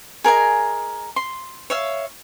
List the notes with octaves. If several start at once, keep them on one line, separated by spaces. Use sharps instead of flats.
G#4 A#4 D#5 G#5
C6
C#5 E5 F5